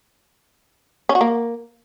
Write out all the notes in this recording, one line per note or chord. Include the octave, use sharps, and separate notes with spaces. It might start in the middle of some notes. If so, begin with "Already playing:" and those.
C#4
F#4
A#3